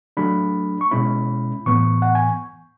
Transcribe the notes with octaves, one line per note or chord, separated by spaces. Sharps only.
F#3 A3 D4 B5
C#6
B2 G#3 C#4 E4 B5
A2 E3 B3 C#6
F#5
G#5